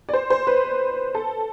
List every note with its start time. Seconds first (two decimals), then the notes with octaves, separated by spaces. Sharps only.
0.09 D5
0.13 C5
0.30 C5
0.47 B4
1.15 A4